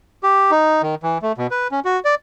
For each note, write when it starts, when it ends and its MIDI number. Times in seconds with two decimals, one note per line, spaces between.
0.23 0.51 67
0.51 0.82 63
0.82 0.95 51
1.03 1.18 52
1.22 1.32 57
1.38 1.47 47
1.51 1.68 71
1.72 1.80 61
1.85 2.00 66
2.05 2.15 74